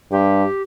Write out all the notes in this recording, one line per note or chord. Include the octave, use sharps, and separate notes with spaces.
G2 G4